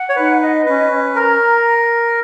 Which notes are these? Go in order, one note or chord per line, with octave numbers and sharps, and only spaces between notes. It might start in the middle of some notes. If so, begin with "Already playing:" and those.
Already playing: F#5
C#5
D#4 B4
D#5
C#4 B4
C#4
A#4 A#5
A#5